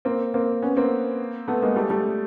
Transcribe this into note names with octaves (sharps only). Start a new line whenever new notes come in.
A#3 C4
A#3 C4
B3 C#4
A#3 C4
A3 B3
G#3 A#3
G3 A3
G3 A3